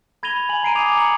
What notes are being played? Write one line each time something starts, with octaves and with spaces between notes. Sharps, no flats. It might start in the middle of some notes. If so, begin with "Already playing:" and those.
B5 G#6 A#6 D#7 F7 G7
G#5 F#7
A#5 C7 D7 D#7
G#5 D6 D#6 G#6 F7
A#5 C#7 F7 F#7